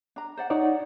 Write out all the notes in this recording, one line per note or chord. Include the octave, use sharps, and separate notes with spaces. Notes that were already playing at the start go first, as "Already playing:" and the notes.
D4 A#5
C5 D5 F#5
D#4 C#5 D5 F#5